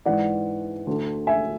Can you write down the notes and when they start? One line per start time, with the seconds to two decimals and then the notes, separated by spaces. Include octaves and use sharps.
0.05 G#2 E3 D5 F#5
0.87 D2 D3
1.27 E5 G#5